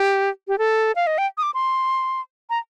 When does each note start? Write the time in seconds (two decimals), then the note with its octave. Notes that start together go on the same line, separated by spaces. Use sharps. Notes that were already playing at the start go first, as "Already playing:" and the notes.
Already playing: G4
0.48 G4
0.58 A4
0.96 F5
1.07 D#5
1.18 G5
1.38 D#6
1.43 D6
1.54 C6
2.50 A#5